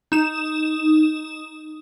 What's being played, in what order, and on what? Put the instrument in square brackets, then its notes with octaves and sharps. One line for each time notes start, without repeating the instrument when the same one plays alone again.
[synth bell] D#4 E7